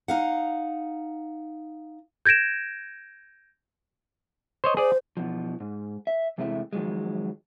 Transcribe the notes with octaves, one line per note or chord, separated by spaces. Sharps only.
D#4 F5 F#5
G6 G#6 A#6 D7 E7
C5 C#5 D#5
G#4 C5 D5
B2 E3 F3
G#2
E5
E2 C3 G#3 A3 D4 E4
D#3 F3 F#3 G#3